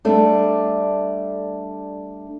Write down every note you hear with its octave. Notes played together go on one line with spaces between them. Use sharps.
G3 A3 D4